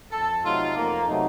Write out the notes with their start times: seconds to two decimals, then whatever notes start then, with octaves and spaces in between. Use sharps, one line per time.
0.11 F2 A4
0.43 C3 F#3 A3 D#4 F4
0.75 F2 A#3
1.08 C3 F#3 A3 D#4